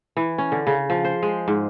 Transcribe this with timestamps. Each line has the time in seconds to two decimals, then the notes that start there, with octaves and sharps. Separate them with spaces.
0.17 E3
0.38 C#4
0.52 D3
0.67 C#3
0.90 F3
1.04 C5
1.23 G#3
1.48 G#2